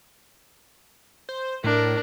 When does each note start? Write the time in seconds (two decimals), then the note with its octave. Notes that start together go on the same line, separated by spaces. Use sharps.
1.29 C5
1.64 A2 D4 A#4